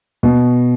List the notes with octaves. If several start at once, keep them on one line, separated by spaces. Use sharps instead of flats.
B2